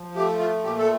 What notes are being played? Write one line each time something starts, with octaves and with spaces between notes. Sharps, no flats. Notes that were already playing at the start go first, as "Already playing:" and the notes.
Already playing: F3
A3 G4
F4
A#2 G4
A4